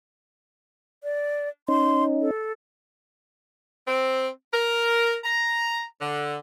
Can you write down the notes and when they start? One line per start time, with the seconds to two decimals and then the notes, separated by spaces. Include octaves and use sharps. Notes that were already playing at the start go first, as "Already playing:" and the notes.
1.04 D5
1.68 C#4 D#4 C6
2.21 A4
3.88 C4
4.53 A#4
5.24 A#5
6.01 D3